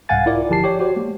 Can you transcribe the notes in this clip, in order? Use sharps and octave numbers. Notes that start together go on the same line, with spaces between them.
C2 G#2 F5 F#5 G#5 A6
E4 F4 A#4 D5
G1 F3 G4 A5 C7
G4 C#5 D5
F#4 G4 C5
G#3 A#3